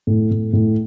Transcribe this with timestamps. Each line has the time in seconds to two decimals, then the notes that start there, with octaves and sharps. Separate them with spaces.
0.07 A2
0.31 A2
0.53 A2